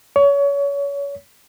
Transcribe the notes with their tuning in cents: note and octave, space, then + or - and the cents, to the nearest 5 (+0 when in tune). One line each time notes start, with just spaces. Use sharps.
C#5 +30